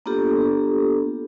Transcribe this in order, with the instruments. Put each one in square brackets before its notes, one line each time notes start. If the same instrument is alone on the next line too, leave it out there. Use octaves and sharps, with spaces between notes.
[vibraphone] A#3 B3 D4 F4 G4 A4